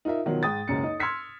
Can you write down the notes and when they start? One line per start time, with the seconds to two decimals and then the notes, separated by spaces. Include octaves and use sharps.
0.05 D#4 F4 A#4 E5
0.26 B2 D#3 F3 F#3
0.43 G#2 G5 D#6 A6
0.68 F#1 C#2 F#2 C#7
0.84 D#4 D#5
1.00 C6 E6 F6 G#6 B6 C#7